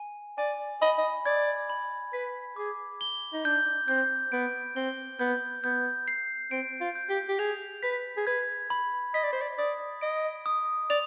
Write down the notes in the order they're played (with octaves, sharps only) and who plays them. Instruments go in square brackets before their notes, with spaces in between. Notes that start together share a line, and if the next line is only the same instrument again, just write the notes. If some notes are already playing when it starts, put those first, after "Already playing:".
Already playing: [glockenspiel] G#5
[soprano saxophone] D5 [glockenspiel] G#5
[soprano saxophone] D#5 [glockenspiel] B5
[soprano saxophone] D#5
[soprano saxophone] D5 [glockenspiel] G#6
[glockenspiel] B5
[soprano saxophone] B4 [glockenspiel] B6
[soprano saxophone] G#4 [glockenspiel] D6
[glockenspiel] G7
[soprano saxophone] D#4
[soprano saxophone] D4 [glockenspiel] G6
[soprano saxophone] C4 [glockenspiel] G6
[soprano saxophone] B3 [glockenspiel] D7
[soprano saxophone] C4 [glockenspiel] G7
[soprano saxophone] B3 [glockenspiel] G6
[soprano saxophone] B3 [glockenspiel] G6
[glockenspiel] C7
[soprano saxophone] C4 [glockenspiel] D7
[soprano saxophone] F4
[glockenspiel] G6
[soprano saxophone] G4
G4
[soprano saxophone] G#4 [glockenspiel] F7
[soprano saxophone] B4 [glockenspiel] B6
[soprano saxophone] G#4
[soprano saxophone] B4 [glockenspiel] G#6
[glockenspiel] B5
[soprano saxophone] D#5 [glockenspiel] B6
[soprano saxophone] D5
C5
D5
[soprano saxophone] D5 [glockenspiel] D#6
[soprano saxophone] D#5 [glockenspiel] D7
[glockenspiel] D#6
[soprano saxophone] D5 [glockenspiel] F7